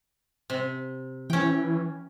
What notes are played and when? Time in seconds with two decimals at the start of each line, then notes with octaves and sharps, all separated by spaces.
0.50 C3
1.30 E3 C#4 G5